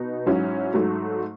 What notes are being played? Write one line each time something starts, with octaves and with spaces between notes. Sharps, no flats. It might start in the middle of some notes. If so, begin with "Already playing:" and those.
Already playing: B2 B3 D#4
G#2 F#3 C#4 E4
G#2 F#3 A3